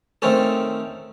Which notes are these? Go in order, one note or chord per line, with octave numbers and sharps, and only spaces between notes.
D#3 A3 C4 C#4 A4